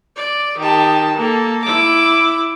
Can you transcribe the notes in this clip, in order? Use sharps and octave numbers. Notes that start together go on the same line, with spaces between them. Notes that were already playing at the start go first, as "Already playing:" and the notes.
D5
D#3 G4 A5
A#3 A4
E4 D6